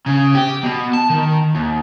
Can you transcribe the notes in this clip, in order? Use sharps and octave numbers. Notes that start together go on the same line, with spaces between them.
C#3
G4
B2
A5
D#3
D#2